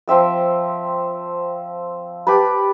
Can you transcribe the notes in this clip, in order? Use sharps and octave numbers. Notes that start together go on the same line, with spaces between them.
F3 C4 E5 G5
G4 B4 A5 B5